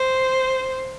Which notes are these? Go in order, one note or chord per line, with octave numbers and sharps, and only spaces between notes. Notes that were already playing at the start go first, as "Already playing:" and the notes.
Already playing: C5